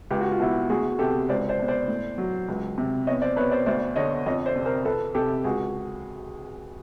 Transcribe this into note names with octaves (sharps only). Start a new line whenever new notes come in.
C#2 G4
F#4
F4
B2 E4 F#4
D2 F#4 G#4
C3 G4 A4
C#2 C5 D5
C5 D5
B2
C5 D5
A2
F#3
C#2
C3
E2 C#5 D#5
C5 D5
B2 B4 C#5
C5 D5
D2 C5 D5
D3 C#5 D#5
F2 C#5 D#5
C5 D5
C3
A#4 C5
F2 A4 B4
C3 G4 A4
C#2 F#4 G#4